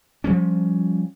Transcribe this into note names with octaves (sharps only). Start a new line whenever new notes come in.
F3 G3 C#4